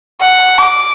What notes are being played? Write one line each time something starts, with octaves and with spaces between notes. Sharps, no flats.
F#5
D6